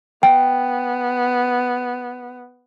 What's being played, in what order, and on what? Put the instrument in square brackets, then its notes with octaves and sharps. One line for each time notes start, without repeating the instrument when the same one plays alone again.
[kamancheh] B3 [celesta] G5